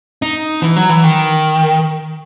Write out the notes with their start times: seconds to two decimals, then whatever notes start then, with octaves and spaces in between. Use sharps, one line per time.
0.22 D#4
0.63 E3
0.76 F#3
0.89 E3
1.04 D#3